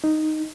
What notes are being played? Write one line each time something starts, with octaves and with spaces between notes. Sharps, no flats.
D#4